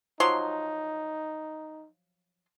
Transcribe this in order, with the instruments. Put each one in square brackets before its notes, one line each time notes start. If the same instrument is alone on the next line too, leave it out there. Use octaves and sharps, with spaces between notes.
[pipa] F3 F#3 C6 [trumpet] D#4